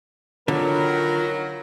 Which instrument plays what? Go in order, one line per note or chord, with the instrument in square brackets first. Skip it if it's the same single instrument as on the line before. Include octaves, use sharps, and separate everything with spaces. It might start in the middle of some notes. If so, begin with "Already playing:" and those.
[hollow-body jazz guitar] D3 [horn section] D#3 F#3 F#4 [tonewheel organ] F4 B5 [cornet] A#4